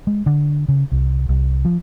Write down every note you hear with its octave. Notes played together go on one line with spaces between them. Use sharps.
G#3
D3
C#3
C2
C2
F3